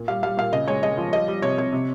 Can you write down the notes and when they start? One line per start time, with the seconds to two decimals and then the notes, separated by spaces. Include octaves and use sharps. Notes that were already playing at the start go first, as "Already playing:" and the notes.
Already playing: A#2
0.08 G3 F5
0.23 G3 F5
0.37 A#2 F5
0.52 C#3 D#5
0.68 G#3 C#5
0.83 G#3 D#5
0.98 F3
1.12 G3 D#5
1.28 G3
1.42 C3 C#5
1.58 C3 C#5
1.72 C3